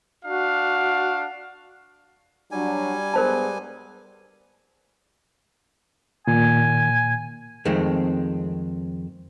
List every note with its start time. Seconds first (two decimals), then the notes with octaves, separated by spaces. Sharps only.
0.24 D4 F#4 F5
2.52 F#3 G3 D4 G#5
3.14 G2 G#3 B3 A#4 C5 A5
6.27 A#2 D#3 G#5
7.65 F2 D#3 G#3 A3 C4